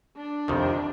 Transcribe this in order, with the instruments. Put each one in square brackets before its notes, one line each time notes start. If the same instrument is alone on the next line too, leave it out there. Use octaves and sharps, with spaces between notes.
[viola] D4
[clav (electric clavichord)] F2 C3 D#3